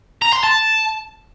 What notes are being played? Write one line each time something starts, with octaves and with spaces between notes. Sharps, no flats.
A#5
C6
A5